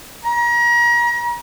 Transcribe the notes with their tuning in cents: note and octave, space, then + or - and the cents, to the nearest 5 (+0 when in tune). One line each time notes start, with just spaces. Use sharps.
A#5 +35